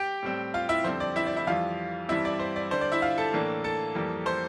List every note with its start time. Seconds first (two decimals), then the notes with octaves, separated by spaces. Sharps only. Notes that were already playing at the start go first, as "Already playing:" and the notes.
Already playing: G4 G5
0.23 A2 G3 C4
0.54 F4 F5
0.69 E4 E5
0.84 F2 D3 G3 C4 C5
1.00 D5
1.16 E4 E5
1.26 D5
1.36 E4 E5
1.47 F2 E3 G3 F4 F5
2.09 G2 E3 G3 C4 E4 E5
2.25 D5
2.39 C5
2.56 D5
2.71 D3 G3 D4 C5
2.81 D5
2.92 E4 E5
3.02 F4 F5
3.18 A4 A5
3.33 A2 E3 A#3 D4
3.64 A4 A5
3.95 F2 E3 G3 A#3
4.26 C5 C6